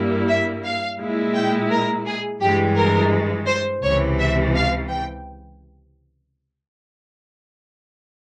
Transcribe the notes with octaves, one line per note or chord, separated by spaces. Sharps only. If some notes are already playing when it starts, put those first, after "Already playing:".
Already playing: G2 G3 A#3 E4
E5
F5
A#2 G#3 E4
G5
A#4
G#4
G2 E3 G#3 G4
A#4
C5
C#2 C3 E3 C#5
E5
F5
G5